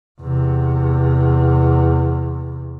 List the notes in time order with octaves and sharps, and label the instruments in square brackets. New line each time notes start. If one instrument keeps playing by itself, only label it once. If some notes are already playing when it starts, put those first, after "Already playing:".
[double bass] E2 C3